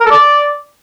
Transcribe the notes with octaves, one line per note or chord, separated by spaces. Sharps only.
A#4
A4
D5